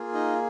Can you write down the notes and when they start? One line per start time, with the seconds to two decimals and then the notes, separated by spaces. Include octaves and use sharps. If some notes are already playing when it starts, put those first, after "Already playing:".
Already playing: A#3 F4 G#4
0.14 D#4 D#5